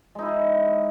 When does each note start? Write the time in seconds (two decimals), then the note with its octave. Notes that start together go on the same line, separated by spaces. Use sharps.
0.15 G#3
0.19 D#4
0.22 E4
0.26 G#4